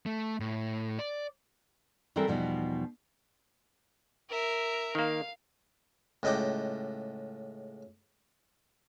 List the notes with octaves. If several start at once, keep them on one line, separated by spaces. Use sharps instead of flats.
A3
A2
D5
E3 G3 C4 A4 A#4
E2 B2 F3 G3 B3 D#4
A#4 E5
D#3 A#3 F5
C#2 A2 D#5 F#5 G5 D6